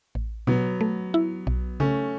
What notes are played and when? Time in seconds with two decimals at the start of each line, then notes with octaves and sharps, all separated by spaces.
0.15 A1
0.47 B2 F#3 B3
0.81 A3
1.14 E4
1.47 B1
1.80 C#3 A3 C#4